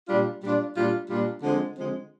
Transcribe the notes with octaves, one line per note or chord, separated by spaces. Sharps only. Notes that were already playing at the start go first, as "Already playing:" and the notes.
A#2 G3 D4 F4
A#2 G3 D4 F4
A#2 G3 D4 F4
A#2 G3 D4 F4
D3 F3 G#3 C4
D3 F3 G#3 C4